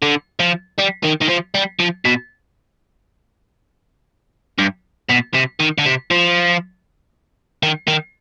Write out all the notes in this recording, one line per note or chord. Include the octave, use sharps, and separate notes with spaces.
D3
F3
G3
D#3
D#3
F3
G3
F3
B2
G2
B2
C3
D#3
D3
C3
F3
D#3
D#3